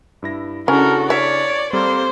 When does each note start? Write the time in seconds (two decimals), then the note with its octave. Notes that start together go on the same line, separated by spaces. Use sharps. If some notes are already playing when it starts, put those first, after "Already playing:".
0.22 G2 E4 A#6
0.68 C#3 C#4 D4 E4 F#4 A4 A#4
1.10 C#5 D5 E5
1.73 G3 A#3 C4 A4 C5